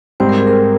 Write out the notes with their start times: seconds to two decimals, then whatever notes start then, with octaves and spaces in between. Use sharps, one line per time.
0.20 G#2 G3 C4 C5
0.29 A#4
0.38 G#4
0.47 A#4